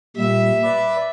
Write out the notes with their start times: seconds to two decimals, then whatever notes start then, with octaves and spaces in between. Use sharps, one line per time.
0.16 A#2 G3 E5
0.63 B4 D5